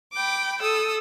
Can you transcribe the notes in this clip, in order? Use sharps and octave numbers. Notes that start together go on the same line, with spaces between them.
G5 B5 D6
A4 D#6 E6